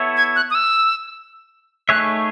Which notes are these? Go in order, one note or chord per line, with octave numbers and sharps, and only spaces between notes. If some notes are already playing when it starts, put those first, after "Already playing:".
Already playing: B3 E4 A4 C#5 E5
G#6
F#6
D#6
E6
A3 D#4 G#4 C#5 E5 F#6